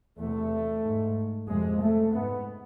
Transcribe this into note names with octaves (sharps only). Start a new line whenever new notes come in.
E2 C3 A3
G#2
F2 C3 G#3
A3
G#2 B3